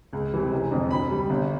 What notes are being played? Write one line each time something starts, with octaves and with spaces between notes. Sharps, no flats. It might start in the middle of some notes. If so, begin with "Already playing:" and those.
C#2
C3 E3 G3
F1
F2 D3
D2 B5
D3 G3
G1